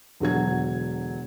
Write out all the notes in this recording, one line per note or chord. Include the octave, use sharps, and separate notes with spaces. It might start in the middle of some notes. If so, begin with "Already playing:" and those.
E1 D3 F#3 G#6